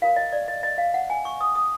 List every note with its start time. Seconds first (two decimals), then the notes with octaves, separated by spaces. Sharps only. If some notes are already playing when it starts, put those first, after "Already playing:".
0.02 F4 A#4 C#5 F5
0.16 D#5
0.32 D5
0.48 D#5
0.63 D#5
0.78 F5
0.94 F#5
1.10 G#5
1.25 C#6
1.41 D#6
1.55 D#6